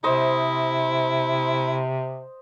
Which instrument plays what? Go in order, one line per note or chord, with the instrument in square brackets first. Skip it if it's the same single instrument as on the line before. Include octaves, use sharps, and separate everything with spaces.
[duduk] C3 [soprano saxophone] E4 [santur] C5 D#5